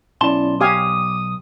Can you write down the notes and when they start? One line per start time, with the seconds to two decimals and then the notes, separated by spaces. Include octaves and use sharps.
0.21 B1 C#4 E4 D5 A5 C6
0.61 G4 F5 G#5 D6 D#6